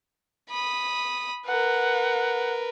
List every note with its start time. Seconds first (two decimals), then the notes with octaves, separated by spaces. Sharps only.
0.49 B5 D#6
1.47 A#4 B4 F#5